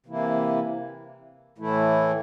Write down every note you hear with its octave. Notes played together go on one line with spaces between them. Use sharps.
C3 E3 A#3 E4
A2 E3 A3 E4